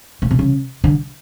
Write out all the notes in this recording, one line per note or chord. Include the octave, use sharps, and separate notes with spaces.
A2
B2
C#3
D3